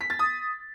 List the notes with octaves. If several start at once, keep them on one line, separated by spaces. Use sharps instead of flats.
B6
A6
D#6